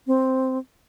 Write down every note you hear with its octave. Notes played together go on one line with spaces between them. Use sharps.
C4